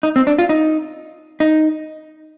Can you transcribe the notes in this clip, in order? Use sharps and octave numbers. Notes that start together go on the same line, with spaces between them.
D#4
C4
D4
F4
D#4
D#4